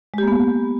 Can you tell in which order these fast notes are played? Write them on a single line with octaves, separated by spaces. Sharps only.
G#3 G4 A#3 B3